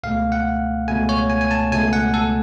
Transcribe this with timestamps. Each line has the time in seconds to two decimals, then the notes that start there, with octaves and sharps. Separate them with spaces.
0.03 C#2 B2 A3 F5
0.32 F#5
0.88 C#2 B2 A3 G#5
1.09 C#5
1.30 G#5
1.41 G#5
1.51 A5
1.72 C#2 B2 A3 G#5
1.93 F#5
2.14 A4